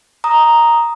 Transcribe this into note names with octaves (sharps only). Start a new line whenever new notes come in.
A#5 D#6